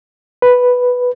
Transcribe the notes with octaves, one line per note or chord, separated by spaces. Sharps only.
B4